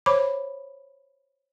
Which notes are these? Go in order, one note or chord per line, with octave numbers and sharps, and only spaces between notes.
C5 C#5 B5 D6